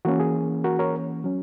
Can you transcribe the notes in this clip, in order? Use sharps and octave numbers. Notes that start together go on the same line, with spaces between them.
E3 A#3 C#4 F#4
G#4
F#4 A#4
A#4 C#5
F#3 C#4